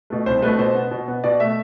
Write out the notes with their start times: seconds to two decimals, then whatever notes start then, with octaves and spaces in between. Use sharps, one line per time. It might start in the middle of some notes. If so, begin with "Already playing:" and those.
0.10 B2 A3
0.26 C2 C5
0.42 B2 A3 B4
0.59 B2 C5
0.75 B3
0.91 B2
1.08 B3
1.24 B2 D5
1.40 A3 E5